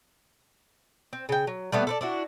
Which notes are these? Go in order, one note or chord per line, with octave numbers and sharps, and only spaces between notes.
C4
C#3 G5
F#3
G3 A3 B3 B4
A4 B4 D5
D4 E4 F#4